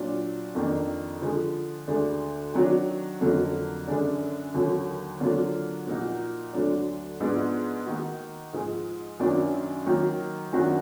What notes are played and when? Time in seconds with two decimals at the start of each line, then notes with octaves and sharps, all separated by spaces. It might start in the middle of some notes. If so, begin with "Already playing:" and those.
Already playing: A#2 F#3 D4 F4
0.55 F2 D#3 A#3 D4
1.21 D3 F3 G#3
1.87 D2 D3 G#3 D4
2.54 D#3 F#3 D4 F#4
3.20 F2 D3 F#3 A#3
3.87 F#2 D3 G#3 D4
4.54 D#2 D3 F#3
5.20 D3 F#3 A#3 D4 F4
5.87 A#2 F3 A#3 D#4 F#4
6.53 D2 D3 F#3 D4
7.20 G#2 F3 G#3 B3 D4
7.86 D#3 A#3 D#4 F#4
8.53 G#2 F3 G#3
9.20 F#2 D#3 F#3 A#3 D4
9.86 D#3 F#3 A#3
10.53 F#2 D#3 F#3 D4 F#4